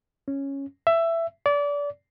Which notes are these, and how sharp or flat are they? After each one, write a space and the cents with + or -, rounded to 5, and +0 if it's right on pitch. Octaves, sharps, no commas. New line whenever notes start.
C#4 -5
E5 +15
D5 -30